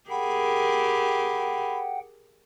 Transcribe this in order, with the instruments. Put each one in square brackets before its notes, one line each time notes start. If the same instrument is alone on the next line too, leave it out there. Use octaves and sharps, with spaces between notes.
[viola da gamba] G4 G#4 A#4 [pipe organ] F#5 G5 [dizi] B5